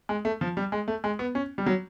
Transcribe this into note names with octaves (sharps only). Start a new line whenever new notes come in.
G#3
A3
F3
G3
G#3
A3
G#3
B3
C#4
G3
F#3